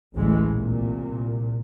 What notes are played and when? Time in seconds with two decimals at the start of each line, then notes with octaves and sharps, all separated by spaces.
0.14 A1 D2 A2 E3 G#3
0.46 C2 A#2